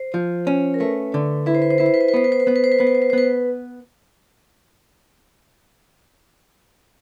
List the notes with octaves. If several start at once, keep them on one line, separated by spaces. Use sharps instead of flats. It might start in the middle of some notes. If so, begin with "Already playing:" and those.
Already playing: C5
F3
C#4
A#4
A3 B4
D3
E4 B4
C5
B4
C5
E4 B4
C5
B4
C5
B4
B3 C5
B4
C5
B4
B3 C5
B4
C5
B4
B3 C5
B4
C5
B4
C5
B3 B4